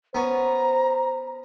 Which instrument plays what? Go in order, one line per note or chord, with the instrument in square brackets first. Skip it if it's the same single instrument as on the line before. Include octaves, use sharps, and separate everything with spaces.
[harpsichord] B3 C#4 [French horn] C5 [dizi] A#5